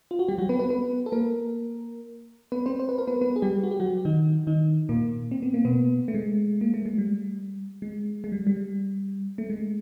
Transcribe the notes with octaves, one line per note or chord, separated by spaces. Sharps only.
F4
F#4
G3 G4
F#3 F#4
B3 B4
B3 B4
B3 B4
A4
A#3 A#4
B3 B4
C4 C5
C5
B4
A#4
B3 B4
B3 B4
G#4
G3 G4
F#4
G4
F#3 F#4
D#3 D#4
D#3 D#4
A#2 A#3
C4
B3
A#3
B2 B3
A3
G#3
A#3
A3
G#3
G3
G#3
G#3
G3
G3
A3
G#3